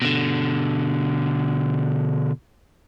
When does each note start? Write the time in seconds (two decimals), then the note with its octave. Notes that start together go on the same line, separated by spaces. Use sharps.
0.02 B2 D3